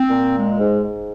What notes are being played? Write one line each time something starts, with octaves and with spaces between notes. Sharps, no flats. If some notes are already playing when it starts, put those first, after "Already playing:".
Already playing: C4
A#2
G#3
G#2
G#2